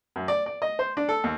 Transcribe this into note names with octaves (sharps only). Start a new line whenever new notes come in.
F#2
D5
D5
D#5
C5
D4
A4
D#2